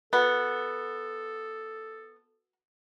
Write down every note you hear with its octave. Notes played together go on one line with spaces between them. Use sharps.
B3 F#4 A4